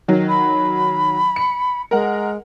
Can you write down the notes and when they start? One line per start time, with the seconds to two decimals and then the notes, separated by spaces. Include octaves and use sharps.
0.08 D#3 F#3
0.28 B5
1.36 C#7
1.91 G#3 A#4 F#5